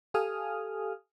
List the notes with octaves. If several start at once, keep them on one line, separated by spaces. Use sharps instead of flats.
G4 A4 F5 G#5 D#6 F6